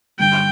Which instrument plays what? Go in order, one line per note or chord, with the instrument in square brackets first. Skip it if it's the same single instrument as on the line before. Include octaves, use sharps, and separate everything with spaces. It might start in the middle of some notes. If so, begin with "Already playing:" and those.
[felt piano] G2 D3 G3 [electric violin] G5